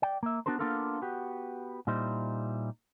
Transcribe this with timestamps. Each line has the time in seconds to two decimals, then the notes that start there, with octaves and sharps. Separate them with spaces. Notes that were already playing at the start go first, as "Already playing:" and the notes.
0.02 D5 G5
0.23 A#3 E5
0.46 B3 D4 F#4 A#4 C5
0.59 A#3 B3 D4 F4 A4 A#4
1.02 B3 F#4 G4
1.87 A#2 G3 D#4 E4 C5